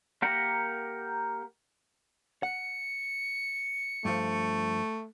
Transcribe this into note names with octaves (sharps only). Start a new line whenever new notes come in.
A#3 G4 A#4 F#5
F#5 C#7
G2 F3 A3